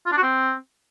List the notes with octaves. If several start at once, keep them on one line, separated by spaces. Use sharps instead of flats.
F4
D4
F#4
C4